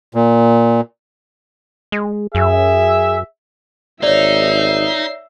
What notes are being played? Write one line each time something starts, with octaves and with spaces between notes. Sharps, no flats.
A#2
G#3
F#2 G#4 E5
G#1 D#4 C#5 D5 E5 C7